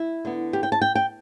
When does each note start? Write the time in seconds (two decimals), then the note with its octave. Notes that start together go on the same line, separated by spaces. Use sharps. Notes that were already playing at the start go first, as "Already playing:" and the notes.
Already playing: E4
0.25 D3 B3
0.53 G4
0.63 G5
0.72 A5
0.81 G5
0.95 G5